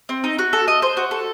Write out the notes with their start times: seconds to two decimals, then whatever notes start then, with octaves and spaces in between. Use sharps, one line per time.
0.09 C4
0.24 D#4
0.39 F#4
0.53 A4
0.68 D#5
0.82 C5
0.97 F#4
1.11 A4